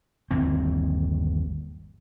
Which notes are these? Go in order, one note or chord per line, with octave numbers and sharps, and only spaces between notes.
G1 D#2 E3 C4